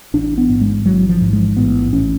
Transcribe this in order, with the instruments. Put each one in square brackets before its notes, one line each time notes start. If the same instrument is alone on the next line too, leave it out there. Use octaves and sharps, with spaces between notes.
[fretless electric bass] A1 D4
B3
G#2
G#3
A1 F#3
F3
G#2
G#3
A1 B3
A1 C#4